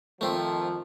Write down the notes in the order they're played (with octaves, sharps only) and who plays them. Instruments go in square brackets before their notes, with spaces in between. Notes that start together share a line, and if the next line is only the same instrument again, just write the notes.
[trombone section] F2 D#3 F3 [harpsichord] A3 C4